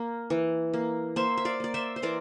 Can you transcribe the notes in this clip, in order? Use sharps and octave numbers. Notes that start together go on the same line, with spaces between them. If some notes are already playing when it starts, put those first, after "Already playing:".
Already playing: A#3
E3
A#3
A#3 C5 E5
E5
D5 F5
A#3 D5
C5 E5
C5
E3 A#4 D5